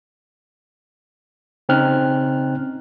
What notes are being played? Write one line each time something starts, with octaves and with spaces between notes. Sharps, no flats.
C#3 C4 C#4 D#4 F6 F#6